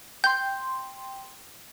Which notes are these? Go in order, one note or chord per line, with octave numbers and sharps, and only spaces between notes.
G5 C6 G6